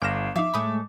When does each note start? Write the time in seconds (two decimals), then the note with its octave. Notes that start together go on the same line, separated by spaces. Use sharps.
0.02 G1 F5 D6 F6 A#6 E7
0.36 F3 D#4 E5 F5 D6
0.54 A2 G#3 A3 B5 D#6